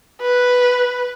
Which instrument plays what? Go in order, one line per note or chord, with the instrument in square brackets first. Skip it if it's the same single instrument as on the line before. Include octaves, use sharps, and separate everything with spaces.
[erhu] B4